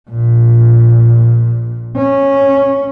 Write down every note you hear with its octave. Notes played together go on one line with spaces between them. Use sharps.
A#1 A#2
C#4